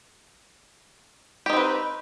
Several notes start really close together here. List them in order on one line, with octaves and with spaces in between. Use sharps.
G4 D#4 C4 B4